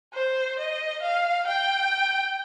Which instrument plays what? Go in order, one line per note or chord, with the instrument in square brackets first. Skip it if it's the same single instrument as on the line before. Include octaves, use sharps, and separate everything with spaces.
[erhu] C5
D#5
F5
G5